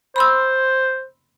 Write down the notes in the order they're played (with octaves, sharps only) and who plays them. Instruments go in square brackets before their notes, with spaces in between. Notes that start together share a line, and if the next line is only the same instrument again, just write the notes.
[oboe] C5 [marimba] B5 C6 E6